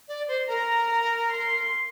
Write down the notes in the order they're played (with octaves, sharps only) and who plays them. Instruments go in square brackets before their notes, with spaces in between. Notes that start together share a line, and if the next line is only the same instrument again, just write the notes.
[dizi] D5
C5
[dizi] A#4 [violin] A#5
[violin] A#5
C6